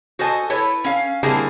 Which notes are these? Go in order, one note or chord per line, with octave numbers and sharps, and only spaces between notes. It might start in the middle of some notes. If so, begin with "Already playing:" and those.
F#4 A4 C5 D#5 G#5
E4 A4 B4 C#5
C#4 F5
D3 G3 A#3 C4 E4 G#4